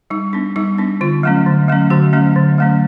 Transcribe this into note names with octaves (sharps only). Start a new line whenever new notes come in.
G3 D#4
B3 D4
G3 D#4
B3 D4
D3 F4
F#3 A3 C#4
D3
F#3 A3 C#4
D3 F#4
F#3 A3 C#4
D3
F#3 A3 C#4